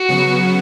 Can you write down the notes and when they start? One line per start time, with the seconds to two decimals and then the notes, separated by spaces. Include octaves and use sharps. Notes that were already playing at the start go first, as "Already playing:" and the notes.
Already playing: F#4
0.09 C#3 F#3 B3